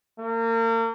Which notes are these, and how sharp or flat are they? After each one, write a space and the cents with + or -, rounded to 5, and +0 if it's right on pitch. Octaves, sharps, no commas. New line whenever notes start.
A#3 -35